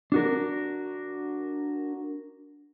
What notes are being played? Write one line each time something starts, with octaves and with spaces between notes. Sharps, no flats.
D4 F#4 A#4